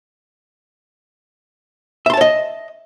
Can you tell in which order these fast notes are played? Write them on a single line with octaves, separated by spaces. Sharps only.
E5 C6 A5 C#5 D#5